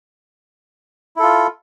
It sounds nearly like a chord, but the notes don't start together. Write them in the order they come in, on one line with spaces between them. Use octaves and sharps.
E4 A4 F4